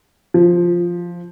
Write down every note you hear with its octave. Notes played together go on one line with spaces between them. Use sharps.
F3